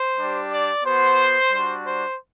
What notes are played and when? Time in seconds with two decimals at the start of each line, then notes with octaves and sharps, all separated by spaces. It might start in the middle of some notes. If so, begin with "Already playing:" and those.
Already playing: C5
0.17 G3 D4 G4
0.51 D5
0.84 B3 F#4 C5
1.51 G3 D4 F#4
1.84 C5